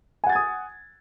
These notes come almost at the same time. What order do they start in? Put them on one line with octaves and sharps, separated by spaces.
G#5 F#5 A6 G#6 D#6